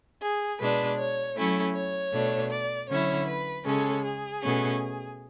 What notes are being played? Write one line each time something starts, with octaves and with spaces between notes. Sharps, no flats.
G#4
B2 G#3 D4 B4
C#5
F#3 A3 C#4 E4
C#5
B2 A3 D4
D5
D3 F#3 C#4 E4 C#5
B4
C#3 G#3 C#4 A4
G#4
B2 A3 C#4